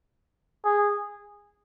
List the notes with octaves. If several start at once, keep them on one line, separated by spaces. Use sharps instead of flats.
G#4